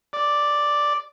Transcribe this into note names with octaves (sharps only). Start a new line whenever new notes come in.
D5